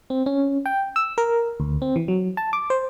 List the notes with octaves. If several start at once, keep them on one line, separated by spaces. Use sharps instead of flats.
C4
C#4
G5
E6
A#4
D2
C4
E3
F#3
A5
D6
C5